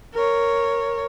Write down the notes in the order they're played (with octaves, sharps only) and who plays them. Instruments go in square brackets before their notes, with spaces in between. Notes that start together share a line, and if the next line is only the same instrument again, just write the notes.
[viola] A#4 C#5